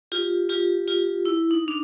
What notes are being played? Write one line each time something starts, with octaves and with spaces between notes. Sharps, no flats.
F4 G4
F4 G4
F4 G4
E4
D#4
D4